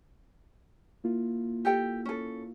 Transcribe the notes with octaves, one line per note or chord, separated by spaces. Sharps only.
A#3 E4 F4
G4 A4 G5
C#4 A4